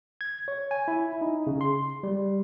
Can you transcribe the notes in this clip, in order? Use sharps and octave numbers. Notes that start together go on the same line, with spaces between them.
G#6
C#5
G#5
E4
D#4
C#3
C6
G3